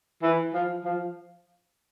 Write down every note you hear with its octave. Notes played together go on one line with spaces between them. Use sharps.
E3
F3
F3